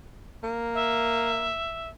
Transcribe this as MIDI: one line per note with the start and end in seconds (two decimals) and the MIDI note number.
0.43 1.61 58
0.74 1.89 76